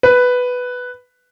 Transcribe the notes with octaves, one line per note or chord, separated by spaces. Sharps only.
B4